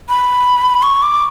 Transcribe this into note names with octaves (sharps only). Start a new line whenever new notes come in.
B5
C#6
D6